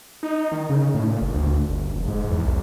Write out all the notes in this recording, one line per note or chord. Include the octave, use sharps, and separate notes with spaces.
D#4
D#3
C#3
A2
A#2
G1
D2
G1
F1
G#2
E2
B1